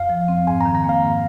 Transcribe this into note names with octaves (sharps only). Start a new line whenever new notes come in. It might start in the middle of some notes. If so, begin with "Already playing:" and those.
Already playing: F2 F5
F3
C4
G#2 G#5
D#3 A#5
A#5
A#3 F5
G#2